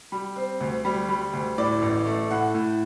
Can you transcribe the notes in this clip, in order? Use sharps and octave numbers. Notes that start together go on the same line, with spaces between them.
G3
C4
D2
G3
G3
D2
A2 D5
A1
A3
A2 F#5
A2